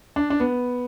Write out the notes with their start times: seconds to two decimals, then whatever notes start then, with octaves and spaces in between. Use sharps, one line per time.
0.16 D4
0.30 D4
0.40 B3